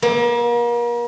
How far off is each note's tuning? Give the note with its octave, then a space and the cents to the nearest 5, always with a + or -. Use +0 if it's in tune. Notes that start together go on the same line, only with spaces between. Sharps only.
A#3 +40